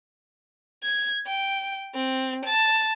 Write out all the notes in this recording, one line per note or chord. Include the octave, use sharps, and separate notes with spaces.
G#6
G5
C4
A5